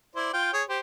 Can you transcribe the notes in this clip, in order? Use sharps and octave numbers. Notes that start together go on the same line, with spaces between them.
E4 C5 D5
F4 G5
G#4 C#5
G4 C5